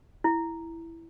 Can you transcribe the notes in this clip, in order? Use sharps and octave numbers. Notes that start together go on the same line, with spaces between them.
E4